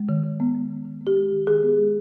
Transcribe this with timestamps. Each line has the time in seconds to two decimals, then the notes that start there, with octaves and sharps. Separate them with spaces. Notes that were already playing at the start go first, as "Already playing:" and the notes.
Already playing: G#3
0.09 D#3
0.23 D#3
0.40 B3
0.55 G#3
0.70 D#3
0.85 D#3
1.01 B3
1.07 G4
1.16 G#3
1.32 D#3
1.47 D#3 G#4
1.63 B3
1.78 G#3